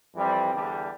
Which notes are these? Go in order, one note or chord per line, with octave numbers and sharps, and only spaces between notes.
F2 E3 G3 C4
E2 D3 G3